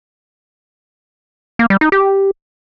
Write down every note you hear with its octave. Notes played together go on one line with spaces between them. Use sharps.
A#3
G3
D#4
G4